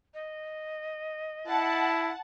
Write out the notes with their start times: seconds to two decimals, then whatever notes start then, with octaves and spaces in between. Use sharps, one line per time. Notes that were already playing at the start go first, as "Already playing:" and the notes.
0.14 D#5
1.47 E4 F#5 A5